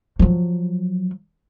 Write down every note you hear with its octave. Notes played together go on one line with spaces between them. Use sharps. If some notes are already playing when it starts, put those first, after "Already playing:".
F3 F#3